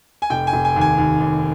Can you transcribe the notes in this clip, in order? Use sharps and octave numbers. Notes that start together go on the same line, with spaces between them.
G#5
F1 G5
G#5
F1
G#5
D#2
G#5
D#2
D#2